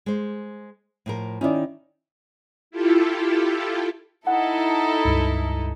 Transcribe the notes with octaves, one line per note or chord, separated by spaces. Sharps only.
G#3 C5
A2 F3 A#4
D#3 C#4 D#4 E4 D5
E4 F4 G4 A4
D#4 E4 A4 F#5
C#2 G2